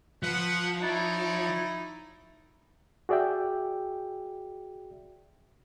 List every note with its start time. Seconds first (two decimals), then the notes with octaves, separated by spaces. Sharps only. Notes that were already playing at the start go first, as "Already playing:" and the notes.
0.23 F3 B4 F#5
0.81 D#4 E4 C#5 D5
3.09 F#4 G#4 D5 E5 G5